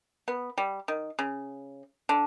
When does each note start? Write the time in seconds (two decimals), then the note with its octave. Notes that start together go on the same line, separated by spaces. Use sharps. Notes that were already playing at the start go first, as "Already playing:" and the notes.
0.28 B3
0.58 G3
0.88 D#3
1.19 C#3
2.09 D3